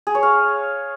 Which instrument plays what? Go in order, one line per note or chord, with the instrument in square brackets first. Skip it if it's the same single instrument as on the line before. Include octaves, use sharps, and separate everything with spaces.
[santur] G#4
C#5
F5